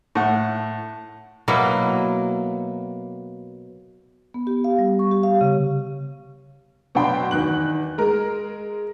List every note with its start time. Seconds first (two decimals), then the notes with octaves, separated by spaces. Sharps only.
0.15 A2 E4 F#5
1.48 B2 F#3 A#3 E4
4.34 B3
4.47 G4
4.64 F5
4.79 G3
4.99 C#6
5.11 G4
5.23 F5
5.41 C#3
6.95 B2 F#3 D4 G5 B5 C6
7.31 E2 D#3 F#6 F#7
7.98 G#3 A#4